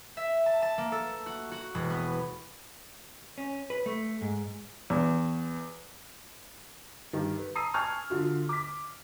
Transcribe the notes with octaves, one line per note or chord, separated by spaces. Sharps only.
E5
A5
A5
A#3
A4
F#4
F#4
E1
B3
C#4
B4
A3
G#2
E2
G2 D#3
B4
A5 A#5 D#6 E6 C7 D#7
G#5 A5 C#6 F6
D3 F4 F#4
D6 B6